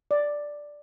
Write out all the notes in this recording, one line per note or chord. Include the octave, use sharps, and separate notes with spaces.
D5